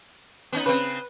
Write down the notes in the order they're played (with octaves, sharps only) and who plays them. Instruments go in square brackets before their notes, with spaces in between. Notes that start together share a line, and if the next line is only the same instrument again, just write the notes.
[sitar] B3 C#4 D#4
[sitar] C#3 C4 [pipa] B4